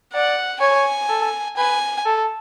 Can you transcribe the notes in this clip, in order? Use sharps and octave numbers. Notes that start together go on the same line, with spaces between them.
D5 F#5
C#5 G#5
A4
B4 G#5
A4